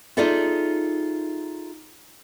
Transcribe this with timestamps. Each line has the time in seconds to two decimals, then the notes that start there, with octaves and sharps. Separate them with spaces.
0.17 D#4 F4 G#4 A4 D5 E5